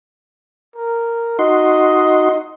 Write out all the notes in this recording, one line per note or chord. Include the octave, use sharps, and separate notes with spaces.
A#4
D#4 F#4 D#5 C6